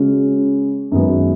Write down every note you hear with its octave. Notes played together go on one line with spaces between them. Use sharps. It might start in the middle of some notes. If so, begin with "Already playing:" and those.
Already playing: C#3 G#3 C#4 F#4
F#2 D#3 G#3 B3 F#4